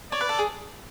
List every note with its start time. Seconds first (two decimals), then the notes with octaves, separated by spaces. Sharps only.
0.12 C#5 D5
0.21 B4
0.29 A4
0.39 G#4